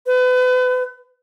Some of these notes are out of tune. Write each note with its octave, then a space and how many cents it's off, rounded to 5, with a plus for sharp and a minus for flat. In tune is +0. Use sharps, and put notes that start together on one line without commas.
B4 +35